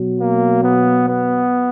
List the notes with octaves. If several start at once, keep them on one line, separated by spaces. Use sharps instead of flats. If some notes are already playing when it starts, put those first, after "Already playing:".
Already playing: B2 F#3
A#3
B3
B3